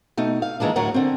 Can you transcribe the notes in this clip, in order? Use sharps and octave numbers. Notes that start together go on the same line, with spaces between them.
B2 A3 D#4
F5
D#3 E3 G#3 A#3 D4
D2 A2 F#3 A#4 F#5
D3 C4